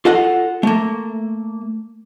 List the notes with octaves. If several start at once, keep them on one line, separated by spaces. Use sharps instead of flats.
F4 A4 D#5 F#5
A3 A#3